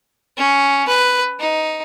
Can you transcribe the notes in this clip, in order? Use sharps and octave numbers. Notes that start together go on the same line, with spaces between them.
C#4
B4
D#4